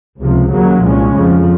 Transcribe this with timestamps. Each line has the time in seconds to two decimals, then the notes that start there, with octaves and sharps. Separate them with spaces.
0.20 C#2 C3 F3
0.52 D#2 C#3 F#3 A#3
0.84 C2 A#2 F3 G#3 C#4
1.15 F2 C#3 F3